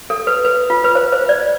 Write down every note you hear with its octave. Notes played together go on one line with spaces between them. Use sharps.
A4
B4
B4
F4
B4
C5
C5
D5